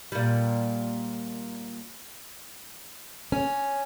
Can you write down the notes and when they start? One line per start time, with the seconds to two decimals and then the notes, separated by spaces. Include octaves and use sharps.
0.12 A#2 G3
3.32 C#4